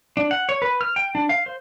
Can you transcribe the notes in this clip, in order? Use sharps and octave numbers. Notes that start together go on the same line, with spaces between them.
D4
F#5
C#5
B4
F6
G5
D4
F5
C5